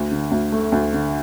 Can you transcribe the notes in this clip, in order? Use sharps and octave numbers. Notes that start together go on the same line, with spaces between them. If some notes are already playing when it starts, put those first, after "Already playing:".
Already playing: D2
D3
D2
A3
D2
D3